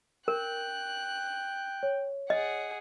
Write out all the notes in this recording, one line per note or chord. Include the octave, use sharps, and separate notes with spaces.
A#4 G5 F#6
C#5
G#4 D#5 F#5